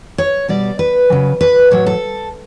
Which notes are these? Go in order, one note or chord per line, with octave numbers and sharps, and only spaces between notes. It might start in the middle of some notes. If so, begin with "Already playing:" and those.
C#5
B2 G3 D5
B4
C#3 F#3
B4
A2 F#3 C#5
A4